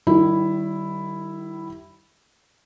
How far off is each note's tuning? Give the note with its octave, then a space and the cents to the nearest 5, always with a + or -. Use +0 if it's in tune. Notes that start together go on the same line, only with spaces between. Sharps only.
D#3 -30 G3 -25 E4 +0